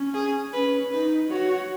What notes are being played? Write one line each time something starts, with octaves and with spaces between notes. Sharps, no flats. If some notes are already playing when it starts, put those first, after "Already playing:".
Already playing: C#4
G#4
C#4 B4
D#4 B4
F#4 C#5